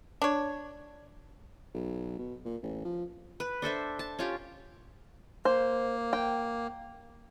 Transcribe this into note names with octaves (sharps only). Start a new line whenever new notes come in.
D4 C#5
B1
B2
A#2
A1
F3
B4
D4 A4 C5 E5
A5
C#4 F4 G4
A#3 C5
G5